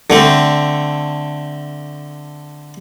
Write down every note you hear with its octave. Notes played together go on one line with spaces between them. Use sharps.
D3 A3 C4